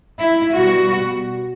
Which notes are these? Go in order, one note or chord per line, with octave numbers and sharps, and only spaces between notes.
E4
B2 G3 B3 F#4